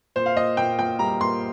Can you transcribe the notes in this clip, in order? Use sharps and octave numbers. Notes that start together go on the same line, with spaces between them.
A#2 C5
F5
A#2 D#5
A#2 G5
A#2 G5
G3 A#5
A#2 C6